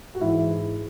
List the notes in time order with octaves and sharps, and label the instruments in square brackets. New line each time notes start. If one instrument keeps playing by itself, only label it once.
[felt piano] F#4
[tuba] G#2 [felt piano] E3 E4